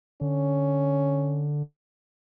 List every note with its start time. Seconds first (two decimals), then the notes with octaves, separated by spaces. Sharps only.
0.21 D3 C#4